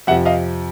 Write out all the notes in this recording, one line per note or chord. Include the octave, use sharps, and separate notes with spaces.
F2 C3 F3 E5 F#5
D#5 F5